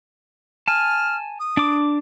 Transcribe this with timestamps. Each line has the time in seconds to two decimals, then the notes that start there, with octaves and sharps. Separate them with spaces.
0.68 G#5 A5 F6
1.40 D#6
1.57 D4 D6